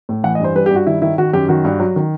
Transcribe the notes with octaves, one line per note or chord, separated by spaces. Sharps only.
A2
E3 F#5
D#5
G2 C5
G3 B4
G4
G2 F#4
D#3 E4
D#3 E4
D#3 F#4
F#2 G4
D#3 F#4
G2
F#3
D#3